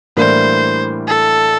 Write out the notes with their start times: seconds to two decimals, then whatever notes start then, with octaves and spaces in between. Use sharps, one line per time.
0.17 A2 E3 G3 A#3 D4 C5
1.08 A4